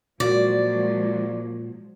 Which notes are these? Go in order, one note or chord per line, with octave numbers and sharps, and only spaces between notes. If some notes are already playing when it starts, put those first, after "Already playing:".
A#2 F3 F#3 G#3 A#3 F#4 D5